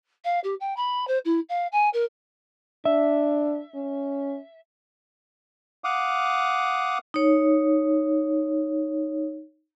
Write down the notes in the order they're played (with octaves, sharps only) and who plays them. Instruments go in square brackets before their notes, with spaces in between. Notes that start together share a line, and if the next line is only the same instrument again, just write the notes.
[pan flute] F5
G4
G5
B5
C5
E4
F5
G#5
A#4
[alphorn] D4 [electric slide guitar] E5
[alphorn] C#4
[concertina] F5 F#5 D6 D#6
[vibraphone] D#4 C#5